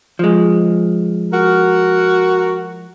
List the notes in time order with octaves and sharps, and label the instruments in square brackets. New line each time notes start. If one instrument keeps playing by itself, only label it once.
[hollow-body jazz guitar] F3 G#3
[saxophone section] F#4 A#4